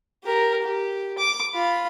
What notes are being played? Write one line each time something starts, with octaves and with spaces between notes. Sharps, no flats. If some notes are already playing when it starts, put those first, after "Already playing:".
G4 A#4
G4
D6
F4 B5